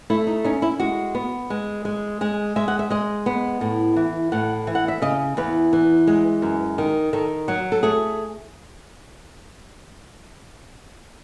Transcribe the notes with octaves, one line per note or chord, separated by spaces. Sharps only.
A3 E4
D#4
C#4 D#4
E4
G#3 F#4
B3
G#3
G#3
G#3 G#4
G#3 E5
F#5
E5
G#3 D#5
B3
A2
E3
A2 F#5
E3
F#5
E5
C#3 D#5
E2 B4
E3
G#3
F#2
D#3
D#3 A4
F#3 F#4
A4
A3 G#4